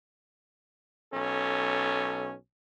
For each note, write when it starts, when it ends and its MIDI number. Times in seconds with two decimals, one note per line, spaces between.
1.13 2.33 35
1.13 2.33 61
1.13 2.33 69